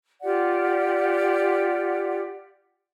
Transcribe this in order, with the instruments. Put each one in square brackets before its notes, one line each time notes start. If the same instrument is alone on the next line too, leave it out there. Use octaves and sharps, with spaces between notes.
[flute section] F4 G4 D5 F#5